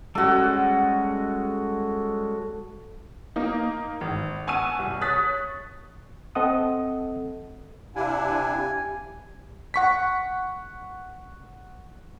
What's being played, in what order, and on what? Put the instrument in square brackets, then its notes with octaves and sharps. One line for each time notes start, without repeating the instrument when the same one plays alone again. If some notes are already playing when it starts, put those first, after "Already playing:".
[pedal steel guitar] G3 G#3 C#4 [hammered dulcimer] F#4 A4
[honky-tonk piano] A#3 D#4
G#1
F#5 G#5 A5 C#6 E6 D#7
C2
C#5 D#6 F#6 A6 B6
[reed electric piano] C4 A4 D#5 F#5 D#6
[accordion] C3 D4 E4 [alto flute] G4 [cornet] F5 [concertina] G#5
[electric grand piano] F#5 C#6 B6